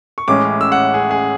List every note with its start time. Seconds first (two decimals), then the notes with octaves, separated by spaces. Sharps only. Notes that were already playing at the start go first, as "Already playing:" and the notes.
0.18 C#6
0.28 A1 A2 G#3 C#4 D6
0.61 E6
0.72 F#5
0.94 G#4
1.11 G#4